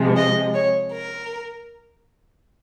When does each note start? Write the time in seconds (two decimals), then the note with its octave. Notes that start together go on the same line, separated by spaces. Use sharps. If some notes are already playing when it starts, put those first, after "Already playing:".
Already playing: C3 F3 G#3
0.17 D#5
0.54 C#5
0.92 A#4